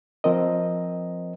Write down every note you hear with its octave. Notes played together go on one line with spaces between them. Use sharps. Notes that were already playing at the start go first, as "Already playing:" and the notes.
F3 C4 A#4 D#5